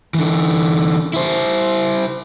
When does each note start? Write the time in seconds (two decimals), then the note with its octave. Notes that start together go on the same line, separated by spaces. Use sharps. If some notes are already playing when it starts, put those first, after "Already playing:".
0.14 D3 E3
1.14 E4 C5